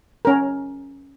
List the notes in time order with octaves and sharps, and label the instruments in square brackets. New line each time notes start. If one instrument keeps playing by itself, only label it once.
[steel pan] C#4 A#4